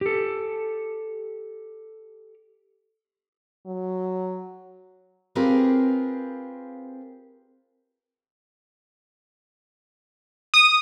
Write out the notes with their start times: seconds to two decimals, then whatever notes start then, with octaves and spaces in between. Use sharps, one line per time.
0.01 G4 A4
3.66 F#3
5.35 C4 F4 G4 G#4 A#4 B4
10.54 D#6